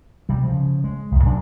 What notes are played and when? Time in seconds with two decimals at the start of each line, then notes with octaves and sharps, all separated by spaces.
0.29 C3 G3
0.44 C#3 F3
0.84 G#3
1.11 C2 F2
1.24 A#2 F#3 D4